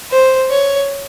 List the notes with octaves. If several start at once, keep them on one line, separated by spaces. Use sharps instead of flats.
C5
C#5